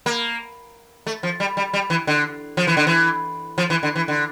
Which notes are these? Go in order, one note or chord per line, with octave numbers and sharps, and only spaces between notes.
A#3
A3
F3
G3
G3
G3
E3
D3
F3
E3
D3
E3
F3
E3
D3
E3
D3